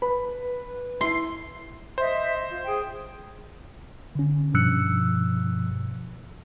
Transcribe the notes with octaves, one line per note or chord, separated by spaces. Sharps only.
B4 B5
E4 C6 C7
C5 D#5 E5
F4
G#4 G5
D3 C#4
G2 B2 F3 E6 F#6 C#7